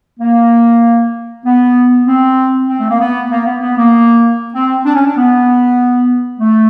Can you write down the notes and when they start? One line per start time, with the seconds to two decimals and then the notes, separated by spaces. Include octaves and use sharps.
0.20 A#3
1.45 B3
2.07 C4
2.68 C4
2.80 A3
2.90 A#3
3.00 B3
3.31 A#3
3.46 B3
3.62 B3
3.78 A#3
4.55 C4
4.86 D4
4.95 C#4
5.05 D4
5.17 B3
6.40 A3